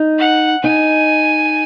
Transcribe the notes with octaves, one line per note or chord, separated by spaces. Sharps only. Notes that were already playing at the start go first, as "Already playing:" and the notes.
Already playing: D#4
F#5
D#4 G#5